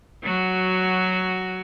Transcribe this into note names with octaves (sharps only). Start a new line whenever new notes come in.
F#3 F#4